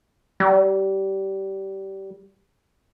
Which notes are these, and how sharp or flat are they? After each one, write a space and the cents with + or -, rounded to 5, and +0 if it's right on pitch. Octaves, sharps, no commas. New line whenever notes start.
G3 -20